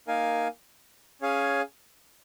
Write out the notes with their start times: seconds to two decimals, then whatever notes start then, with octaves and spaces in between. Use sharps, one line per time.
0.07 A#3 D#4 A#4 F5 G#5
1.21 C#4 G#4 C#5 F5 G#5